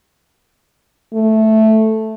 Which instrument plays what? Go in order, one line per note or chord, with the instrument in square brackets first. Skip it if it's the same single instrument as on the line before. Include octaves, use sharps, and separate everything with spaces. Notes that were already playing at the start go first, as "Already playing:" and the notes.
[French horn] A3